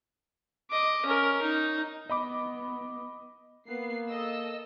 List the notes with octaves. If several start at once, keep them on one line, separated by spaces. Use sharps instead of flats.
D#5 D6
C#4 A#4
D#4
B3 D#5 B5 D6
A#3 B3 C7
A4 D#5 E6